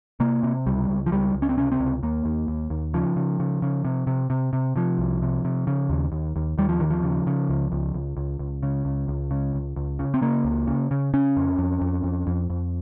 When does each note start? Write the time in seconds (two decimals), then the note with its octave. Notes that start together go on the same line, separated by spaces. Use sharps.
0.20 C3 A#3
0.43 C3
0.66 C#2 G3
0.89 C#2
1.06 F3
1.11 C#2 G3
1.34 C#2
1.42 C#4
1.49 C4
1.57 C3 C#4
1.72 C4
1.80 C#2
2.03 D#2 A#3
2.25 D#2
2.48 D#2
2.70 D#2
2.94 C#3 F3
3.16 C#3
3.40 C#3
3.62 C#3
3.85 C3
4.07 C3
4.30 C3
4.53 C3
4.76 C3 F3
4.98 C2
5.22 C3
5.45 C3
5.67 C#3
5.89 D#2
6.12 D#2
6.36 D#2
6.58 D#2 G3
6.69 F3
6.80 D#2 D#3
6.90 F3
7.03 C#3
7.27 C#3
7.49 C#2
7.72 C#2
7.94 C#2
8.17 C#2
8.39 C#2
8.63 C#3
8.85 C#2
9.08 C#2
9.31 C#3
9.54 C#2
9.76 C#2
9.99 C#3
10.14 C4
10.22 C#3 A#3
10.45 C#2
10.67 C#3
10.91 C#3
11.14 C#3 C#4
11.37 F2
11.58 F2
11.81 F2
12.04 F2
12.27 F2
12.50 F2